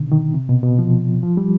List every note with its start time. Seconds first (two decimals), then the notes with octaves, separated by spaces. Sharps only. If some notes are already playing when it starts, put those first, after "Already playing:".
Already playing: B2 D3 D#3
0.12 D#3
0.34 C3
0.49 B2
0.63 B2
0.79 F3
1.23 F3
1.37 G3